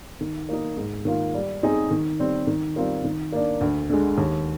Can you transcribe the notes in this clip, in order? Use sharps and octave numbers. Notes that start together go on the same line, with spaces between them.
D#3
A#3 D#4
G#2
D#3 A#3 F4
G3
C4 D#4 G#4
D#3
G3 C4
D#3
G3 C4 F4 A#4
D#3
A#3 D4
D2
D3 G#3
D#2